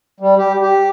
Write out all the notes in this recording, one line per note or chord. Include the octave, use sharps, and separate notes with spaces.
G3
G4
G4